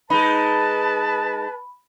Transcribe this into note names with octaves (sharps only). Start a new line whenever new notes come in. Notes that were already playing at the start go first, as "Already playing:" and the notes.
G#3 D#4 B4 A5 B5